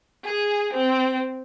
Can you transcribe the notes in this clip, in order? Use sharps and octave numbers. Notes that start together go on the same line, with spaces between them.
G#4
C4